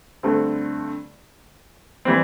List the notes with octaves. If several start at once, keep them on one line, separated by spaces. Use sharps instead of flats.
G2 D3 A3 C4
E3 G3 C4